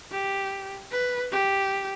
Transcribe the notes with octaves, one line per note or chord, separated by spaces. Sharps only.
G4
B4
G4